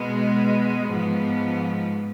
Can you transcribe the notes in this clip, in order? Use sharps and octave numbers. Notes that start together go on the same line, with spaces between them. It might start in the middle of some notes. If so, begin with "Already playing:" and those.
Already playing: B2 G#3 B3
G#2 F3 B3